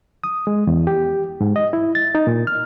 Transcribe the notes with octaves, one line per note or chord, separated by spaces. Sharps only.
D#6
G#3
E2
G4
G#2
D#5
E4
A6
D#4
A#2
F6